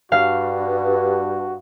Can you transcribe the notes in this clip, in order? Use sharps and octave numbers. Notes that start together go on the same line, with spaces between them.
G2 F#4 F5